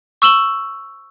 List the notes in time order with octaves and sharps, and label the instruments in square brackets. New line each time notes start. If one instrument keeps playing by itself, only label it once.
[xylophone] C#6 E6 E7 F#7 G7